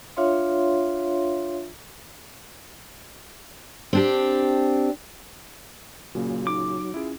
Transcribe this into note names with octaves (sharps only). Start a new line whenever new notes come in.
D4 F4 C#5 E5 F5 C6
C4 D4 G4
A#2 C#3 F#3 A#3
D#4 D6
C#4 E4 F4 G#4